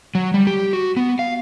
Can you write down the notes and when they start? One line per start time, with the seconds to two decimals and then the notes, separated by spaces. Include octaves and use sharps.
0.15 F#3
0.34 G3
0.47 G4
0.73 F#4
0.97 B3
1.19 F5